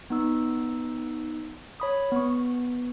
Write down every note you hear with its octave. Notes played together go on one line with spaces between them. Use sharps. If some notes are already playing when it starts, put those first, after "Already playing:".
B3 D#4 E6
C#5 B5 D#6
B3 C#6